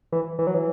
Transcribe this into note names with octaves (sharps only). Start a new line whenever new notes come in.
E3
E3
F#3
E3